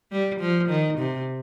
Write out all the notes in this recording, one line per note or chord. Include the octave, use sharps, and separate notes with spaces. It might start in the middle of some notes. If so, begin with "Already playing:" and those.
G3
F3
D#3
C3